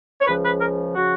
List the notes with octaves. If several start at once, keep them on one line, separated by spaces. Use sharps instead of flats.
C#5
C#2 C#3 F3 B4
B4
A#4
C#3 F3 F#4